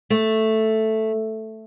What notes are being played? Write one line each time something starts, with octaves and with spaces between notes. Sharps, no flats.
A3